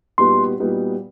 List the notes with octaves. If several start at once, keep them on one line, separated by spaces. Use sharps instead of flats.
A#2 G3 B3 D#4 F#4 C6
A#2 G3 B3 D#4 F#4